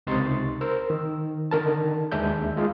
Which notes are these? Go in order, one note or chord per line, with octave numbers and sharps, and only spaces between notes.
C#2 C3 D#4 C6 C#6 A6
A#4 C5 E6
D#3
D3 D#3 A#4 A5
D#2 G#3 D4 E5 G6
G#3 F4 G#4